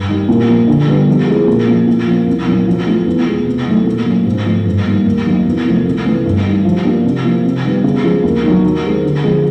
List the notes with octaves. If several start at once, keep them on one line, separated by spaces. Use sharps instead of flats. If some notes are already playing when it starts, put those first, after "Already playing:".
Already playing: G2
D#3 G3
A#2
F3 A#3
D3
G3 B3 D4
F3
G#3 C4 E4 G#4
A#2
F3 A#3 C#4
A#2
F3 A#3 C#4
C2
A#2 F#3 A#3 C#4
F3
A3 C#4 F4
E2
B2 G#3
C3
D#3 F#3 A3
A#2
F#3 A#3 C#4
G#2
F3 A3
G2
D#3 G3 A#3
D#2
D#3 F#3 A#3 D#4
E2
C3 F3 A3
C2
C3 E3 A3 C#4
G2
D#3 G3
F3
A#3 D4 G4
C3
F3 A#3
C3
D#3 G3 B3
C#3
F3 G#3
D#2
D#3 F#3
D#3
G#3 C4 D#4 G4
D3
F3 G#3 C4